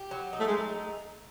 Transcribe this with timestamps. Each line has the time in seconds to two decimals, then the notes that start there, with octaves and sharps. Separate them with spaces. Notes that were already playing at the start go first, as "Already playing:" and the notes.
Already playing: G4
0.11 F#3
0.33 D#4
0.40 A3
0.47 G#3